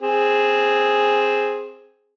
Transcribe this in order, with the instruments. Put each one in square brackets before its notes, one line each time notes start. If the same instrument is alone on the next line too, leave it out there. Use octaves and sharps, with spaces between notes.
[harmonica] C4 G#4